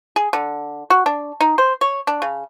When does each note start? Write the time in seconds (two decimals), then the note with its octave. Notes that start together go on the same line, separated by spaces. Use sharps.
0.16 G#4
0.33 D3
0.90 F#4
1.06 D4
1.41 D#4
1.58 C5
1.81 C#5
2.07 D4
2.22 C#3